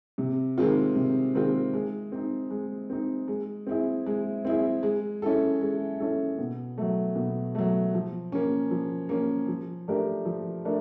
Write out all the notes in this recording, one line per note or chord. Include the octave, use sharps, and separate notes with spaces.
C3
D#3 G#3 C4 F4
C3
D#3 G#3 C4 F4
G#3
C4 D#4
G#3
C4 D#4
G#3
C4 E4 G#4
G#3
C4 E4 G#4
G#3
C#4 E4 A4
G#3
C#4 E4 A4
B2
F#3 A3
B2
F#3 A3
F3
A#3 C#4
F3
A#3 C#4
F3
A3 D4 G4 A#4
F3
A3 D4 A#4